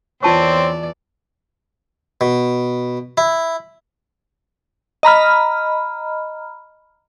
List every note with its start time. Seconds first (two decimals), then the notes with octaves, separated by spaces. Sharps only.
0.23 E2 E3 C4 F4 C#5 D5 A5 C#6
2.21 B2
3.17 E4
5.03 D#5 A#5 B5 F6